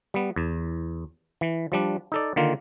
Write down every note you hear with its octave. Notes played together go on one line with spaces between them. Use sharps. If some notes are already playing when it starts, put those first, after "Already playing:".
G3 B3
E2
E3
F3 G3 D4
D#4 A4 D5
D3 D#3 A#3 F4